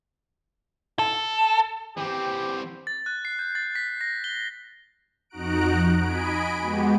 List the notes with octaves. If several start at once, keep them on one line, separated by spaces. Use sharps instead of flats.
A4
E3 C4 G4
A6
F#6
C7
G6
A6
B6
A#6
G7
F2 D#4 F#4 A#5 F#6 D7
D#5 G#5 B5 D7
G#3 B3 F#4 G4